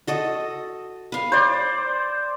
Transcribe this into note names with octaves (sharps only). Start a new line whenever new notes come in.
F#4 A4 D#5
B4 F5
C5 D5